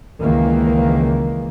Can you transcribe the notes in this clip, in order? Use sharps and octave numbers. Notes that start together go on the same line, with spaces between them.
C#2 D#3 E3 A#3